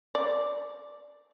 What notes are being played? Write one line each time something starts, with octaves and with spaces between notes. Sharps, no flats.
D5